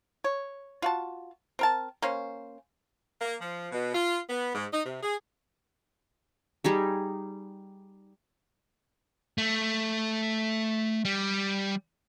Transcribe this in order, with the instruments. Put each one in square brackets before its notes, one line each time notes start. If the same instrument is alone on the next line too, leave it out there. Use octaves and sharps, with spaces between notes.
[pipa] C#5
F4 F#4 A5
C4 A#4 A5
A#3 C#4 C5
[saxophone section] A#3
F3
B2
F4
B3
G#2
D#4
C3
G#4
[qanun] G3 D#4 G#4
[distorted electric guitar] A3
G3